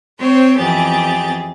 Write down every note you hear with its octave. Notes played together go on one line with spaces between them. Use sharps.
C4 C5 C#5 G5
F2 E3 B3 G4 G#4 A6